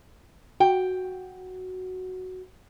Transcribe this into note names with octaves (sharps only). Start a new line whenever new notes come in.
F#4 G5